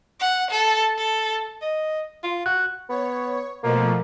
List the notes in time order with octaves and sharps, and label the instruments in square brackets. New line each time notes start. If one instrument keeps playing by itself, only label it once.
[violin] F#5
A4
A4
[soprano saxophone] D#5
F4
[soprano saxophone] F#4 [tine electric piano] F#6
[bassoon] B3 [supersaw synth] C#5
[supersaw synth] B2 F3 A3 [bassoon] A#3